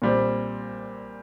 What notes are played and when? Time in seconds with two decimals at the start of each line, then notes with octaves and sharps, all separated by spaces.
0.02 A#2 G3 C4